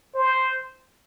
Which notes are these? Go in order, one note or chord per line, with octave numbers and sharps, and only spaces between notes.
C5